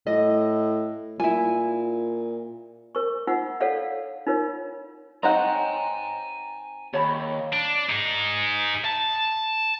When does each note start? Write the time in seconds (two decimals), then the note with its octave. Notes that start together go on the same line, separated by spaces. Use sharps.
0.07 A2 D#5
1.20 A#2 E4 G#5
2.95 A#4 C#6
3.27 D#4 F4 F#5 E6
3.60 A4 C#5 D5 F5 F#5
4.27 D#4 F4 A#4 C#5
5.23 C4 D#4 C5 C#5 D#5 F#5 G#5 A#5
6.93 D#2 C#5 B5
7.53 D4
7.89 D#4 G#4
8.85 A5